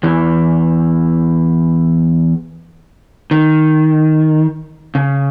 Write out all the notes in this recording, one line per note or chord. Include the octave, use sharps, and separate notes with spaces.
E2 E3
D#3
C#3